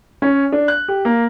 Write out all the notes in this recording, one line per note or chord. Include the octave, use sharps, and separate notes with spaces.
C#4
D4
F#6
G4
A#3